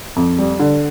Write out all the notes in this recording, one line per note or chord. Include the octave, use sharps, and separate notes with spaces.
F2
G3
D3